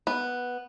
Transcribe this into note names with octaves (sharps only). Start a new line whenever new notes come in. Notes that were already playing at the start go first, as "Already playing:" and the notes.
B3